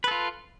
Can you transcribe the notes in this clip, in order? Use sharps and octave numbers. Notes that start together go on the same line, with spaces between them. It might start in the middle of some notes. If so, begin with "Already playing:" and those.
F4 A4 B4